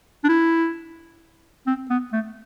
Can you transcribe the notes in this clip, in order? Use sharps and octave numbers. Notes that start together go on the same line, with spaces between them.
D4
E4
C4
B3
A3